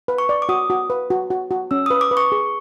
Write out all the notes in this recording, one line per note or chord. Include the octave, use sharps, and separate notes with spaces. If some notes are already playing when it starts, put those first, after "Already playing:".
B4
C#6
D5
D6
F#4 D#6
F#4
B4
F#4
F#4
F#4
C#4 E6
D#6
B4
D6
B4
C#6
G#4